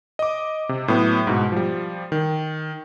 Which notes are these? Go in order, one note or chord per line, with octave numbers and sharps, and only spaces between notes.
D#5 D6
C3
A2 F#3 B3
G#2 B2
F3 G3
D#3